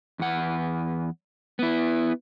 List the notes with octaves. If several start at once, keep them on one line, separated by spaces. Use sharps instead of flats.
E2 F#5
B3 E4